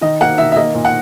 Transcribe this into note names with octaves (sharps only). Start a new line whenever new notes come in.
D#3 D#5
A#3 F#5
D#3 E5
E5
A#3 D#5
A#2
F#5